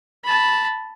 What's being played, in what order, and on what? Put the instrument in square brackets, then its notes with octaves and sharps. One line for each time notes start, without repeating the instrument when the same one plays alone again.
[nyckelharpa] A5 B5